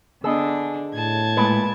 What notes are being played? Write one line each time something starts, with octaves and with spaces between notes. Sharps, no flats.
D3 B3 D4 G#4 D#5 E6
A2 A5 G#6
A#2 G#3 B4 D5